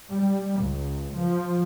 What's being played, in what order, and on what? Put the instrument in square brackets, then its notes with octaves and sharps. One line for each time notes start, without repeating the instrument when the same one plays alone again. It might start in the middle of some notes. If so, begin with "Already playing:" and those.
[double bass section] G3
C#2
F3